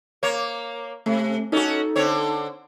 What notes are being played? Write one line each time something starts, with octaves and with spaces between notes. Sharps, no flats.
A#3 C#5
C3 A3
C#4 D#4 F#4 A4
D3 C4 C#5